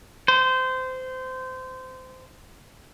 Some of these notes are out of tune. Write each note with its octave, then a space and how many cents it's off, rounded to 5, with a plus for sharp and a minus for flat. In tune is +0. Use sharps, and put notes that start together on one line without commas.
C5 -20